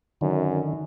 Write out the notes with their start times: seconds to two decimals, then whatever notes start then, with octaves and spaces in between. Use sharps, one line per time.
0.21 F#2 D3 D#3